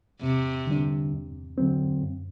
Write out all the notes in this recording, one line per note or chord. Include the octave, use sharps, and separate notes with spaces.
E2 C3
D3 G3 D4
E2
D3 F#3 C4
F#2